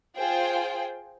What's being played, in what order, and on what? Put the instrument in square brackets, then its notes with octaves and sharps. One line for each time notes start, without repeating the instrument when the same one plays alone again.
[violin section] F4 G#4 C5 G5